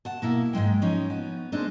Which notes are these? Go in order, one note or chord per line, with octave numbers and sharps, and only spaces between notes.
F#5 A5
B2 A#3 E4
G#2 E3 G#3 G5
F3 C#4 D#4
B3
G#3 C4 D4 D#4